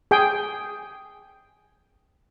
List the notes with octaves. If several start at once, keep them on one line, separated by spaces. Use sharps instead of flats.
G#4 G5 G#5